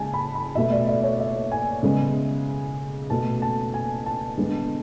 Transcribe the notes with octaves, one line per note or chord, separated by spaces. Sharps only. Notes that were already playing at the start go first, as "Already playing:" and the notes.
Already playing: C#3 G#3 G#5 A5
B5
B5
B2 A3 E5
D5
E5
C#5
E5
G#5
C#3 G#3 B3
B2 A3 A5
A5
G#5
A5
D3 G#3 B3